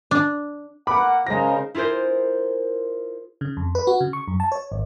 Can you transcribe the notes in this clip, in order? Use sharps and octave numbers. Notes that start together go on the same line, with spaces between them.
D4
A#3 F#5 B5 D6
C#3 G#3 D#4 A#4 C5 A#6
E4 F4 G#4 A#4 C5
C#3
F2
B4
F#4
C#3
C#6
F#2
A5
C#5
G#1